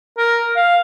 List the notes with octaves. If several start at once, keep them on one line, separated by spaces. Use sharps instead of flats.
A#4
F5